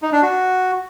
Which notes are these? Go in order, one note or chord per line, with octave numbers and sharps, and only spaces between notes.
D#4
D4
F#4